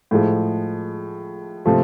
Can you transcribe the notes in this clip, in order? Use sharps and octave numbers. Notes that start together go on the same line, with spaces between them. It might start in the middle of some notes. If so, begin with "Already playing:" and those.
A2 F3 G#3
C3 F3 A3